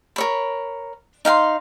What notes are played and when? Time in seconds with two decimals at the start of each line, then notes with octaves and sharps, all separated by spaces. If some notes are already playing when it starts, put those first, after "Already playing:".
0.16 A#4 C#5 B5
1.25 D#4 F5 F#5 C6